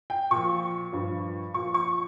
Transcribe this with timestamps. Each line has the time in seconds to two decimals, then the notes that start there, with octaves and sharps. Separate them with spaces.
0.10 G5
0.31 A#2 F3 C#6
0.92 G2 F3
1.54 A#2 F3 C#6
1.74 C#6